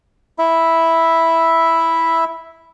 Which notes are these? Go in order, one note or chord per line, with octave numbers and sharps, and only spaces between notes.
E4 E5